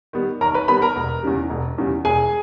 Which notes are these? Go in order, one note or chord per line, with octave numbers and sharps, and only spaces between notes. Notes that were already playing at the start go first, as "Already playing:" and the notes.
D#3 G3 B3
D#2 A#4 A#5
B4 B5
D#3 G3 B3 B4 B5
A#4 A#5
E1
E2 C#3 G3
E1
E2 C#3 G3
E1 G#4 G#5